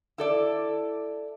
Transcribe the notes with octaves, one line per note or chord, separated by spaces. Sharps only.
E4 A4 D5